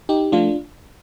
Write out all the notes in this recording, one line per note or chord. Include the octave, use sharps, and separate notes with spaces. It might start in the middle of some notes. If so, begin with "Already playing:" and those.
D#4 G4
F3 A3 D4 F4